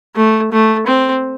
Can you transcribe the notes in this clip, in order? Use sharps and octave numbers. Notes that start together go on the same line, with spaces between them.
A3
A3
C4